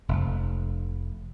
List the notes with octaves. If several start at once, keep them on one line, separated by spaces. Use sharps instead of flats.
F1